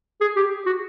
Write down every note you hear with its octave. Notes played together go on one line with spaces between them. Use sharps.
G#4
G4
F#4